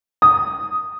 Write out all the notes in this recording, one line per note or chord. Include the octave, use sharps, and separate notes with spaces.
D#6